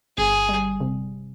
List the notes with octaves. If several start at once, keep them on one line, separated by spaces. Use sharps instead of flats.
G1 G#4
G3
C3